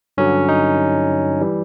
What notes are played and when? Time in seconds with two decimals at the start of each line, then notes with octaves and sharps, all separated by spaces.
0.18 G2 D3 F#3 C#4
0.49 D#4
1.41 E3 G3